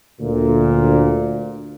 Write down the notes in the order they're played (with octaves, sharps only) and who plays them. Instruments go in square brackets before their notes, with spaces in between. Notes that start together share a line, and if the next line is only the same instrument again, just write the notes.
[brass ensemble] D2 A#2